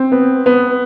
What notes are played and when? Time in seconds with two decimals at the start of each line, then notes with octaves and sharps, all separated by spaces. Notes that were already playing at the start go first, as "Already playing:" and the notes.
Already playing: C4
0.12 B3
0.46 B3